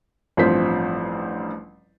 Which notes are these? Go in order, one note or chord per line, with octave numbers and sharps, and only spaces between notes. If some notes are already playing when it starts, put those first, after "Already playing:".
A1 G2 F3 C4 C5 B6